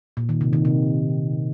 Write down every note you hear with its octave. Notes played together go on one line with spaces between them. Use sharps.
A#2
D#3
C3
D#3
C3